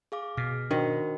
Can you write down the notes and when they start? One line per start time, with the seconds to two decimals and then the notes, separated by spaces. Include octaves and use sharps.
0.12 G#4 F5 D6
0.37 B2 F6
0.71 D#3 D4 F#4 C5